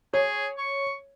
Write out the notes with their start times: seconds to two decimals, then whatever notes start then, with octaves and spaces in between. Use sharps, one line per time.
0.14 G#4 C#5
0.58 C#6